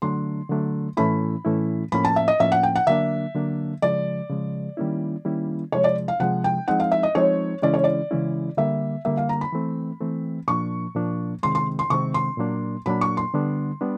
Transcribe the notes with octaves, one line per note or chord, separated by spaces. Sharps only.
D3 F#3 A3 D4 C6
D3 F#3 A3 D4
A2 E3 A3 C#4 E4 B5
A2 E3 A3 C#4 E4
A2 F3 A#3 C#4 B5
A5
E5
D#5
A2 F3 A#3 C#4 E5
F#5
G5
F#5
D3 F#3 A#3 D4 E5
D3 F#3 A#3 D4
C#3 F3 G#3 D5
C#3 F3 G#3
D#3 G3 A#3 C#4 E4
D#3 G3 A#3 C#4 E4
C3 F3 G#3 C#5
D5
F5
C3 F3 G#3 F#5
G5
F3 G#3 C4 D#4 F#5
F5
E5
D#5
F3 G#3 C4 D#4 C#5
C#3 E3 G#3 C#4 E4 D5
C#5
D5
C#3 E3 G#3 C#4 E4
D3 G3 A#3 E5
D3 G3 A#3 E5
F5
A#5
B5
E3 A3 C4
E3 A3 C4
A#2 F3 A#3 D4 C#6
A#2 F3 A#3 D4
C3 D#3 G#3 C4 C6
C6
C6
C3 D#3 G#3 C4 C#6
C6
A#2 F#3 A#3 D4
A#2 F#3 A#3 D4 B5
C#6
C6
D3 G3 B3 D4
G3 B3 D4